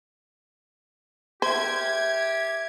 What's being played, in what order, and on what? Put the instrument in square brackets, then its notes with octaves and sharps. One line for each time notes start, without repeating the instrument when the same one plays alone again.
[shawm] G4 [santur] A#4 E5 [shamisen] C5 [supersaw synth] G#6